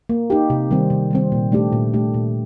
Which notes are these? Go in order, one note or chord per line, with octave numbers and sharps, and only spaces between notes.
A#3
D#4 G4
C3
D#3 G3 C4
C3
D#3 G3 C4
A#2
A3 D4 G4
A#2
A3 D4 G4
A#2